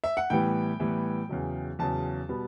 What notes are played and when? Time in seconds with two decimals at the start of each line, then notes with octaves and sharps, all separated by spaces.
0.04 E5
0.17 F#5
0.30 A2 E3 G3 B3 G5
0.80 A2 E3 G3 B3
1.29 E2 C#3 F#3
1.79 E2 C#3 F#3 A5
2.29 B2 G3 B3